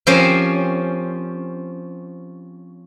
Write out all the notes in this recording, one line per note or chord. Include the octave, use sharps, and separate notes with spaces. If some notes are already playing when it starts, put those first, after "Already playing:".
F3 C4 C#4 G4 A#4 C5